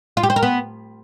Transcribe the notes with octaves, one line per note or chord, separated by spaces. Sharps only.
F4
G4
C5
A#4
B3